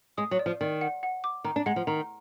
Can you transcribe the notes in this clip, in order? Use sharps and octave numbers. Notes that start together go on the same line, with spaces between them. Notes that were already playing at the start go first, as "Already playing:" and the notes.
G#3 D#6
F#3
D5
F3
D#3 D5
F#5
F#5
D6
D#3 A#5
D4
G#3 F#5
F3
D#3 A#5